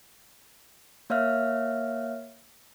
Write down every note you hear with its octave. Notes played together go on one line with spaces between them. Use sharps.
A#3 C#5 E5 F5 F6